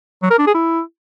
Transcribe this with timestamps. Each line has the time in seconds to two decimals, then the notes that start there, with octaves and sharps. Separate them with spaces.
0.23 F#3
0.31 A#4
0.39 D4
0.47 G#4
0.55 E4